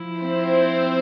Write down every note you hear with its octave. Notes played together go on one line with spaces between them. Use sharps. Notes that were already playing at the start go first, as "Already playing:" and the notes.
Already playing: F3 E4
C4 C5